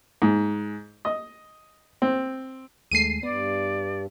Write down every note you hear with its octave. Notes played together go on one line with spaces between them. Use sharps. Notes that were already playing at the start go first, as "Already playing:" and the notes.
G#2
D#5
C4
D#2 G#3 A3 C7 D#7
G2 B3 D5